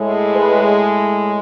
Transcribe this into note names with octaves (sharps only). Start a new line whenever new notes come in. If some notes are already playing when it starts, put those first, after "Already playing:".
Already playing: A2 G#3
B4